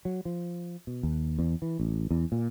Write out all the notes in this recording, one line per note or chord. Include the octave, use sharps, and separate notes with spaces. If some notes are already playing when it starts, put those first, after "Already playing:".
F#3
F3
B2
D#2
E2
E3
A1
E2
A#2